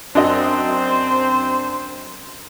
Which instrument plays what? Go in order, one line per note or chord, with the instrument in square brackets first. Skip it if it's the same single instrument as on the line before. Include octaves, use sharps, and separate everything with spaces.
[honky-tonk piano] F#2 F#4 D#5 [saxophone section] C4 [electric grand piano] D4 [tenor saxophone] C5